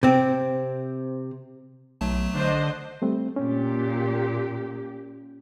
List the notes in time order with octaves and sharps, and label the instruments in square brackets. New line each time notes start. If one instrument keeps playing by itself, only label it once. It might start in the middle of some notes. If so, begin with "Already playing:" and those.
[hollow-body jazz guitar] C3 C4
[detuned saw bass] B1 [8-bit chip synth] F#3 A3 A5
[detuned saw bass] D3 [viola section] D4 C5 D#5
[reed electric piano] G3 A3 C4
[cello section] A#2 G4 [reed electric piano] C#4